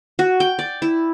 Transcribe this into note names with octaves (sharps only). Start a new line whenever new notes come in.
F#4
G5
D5
E4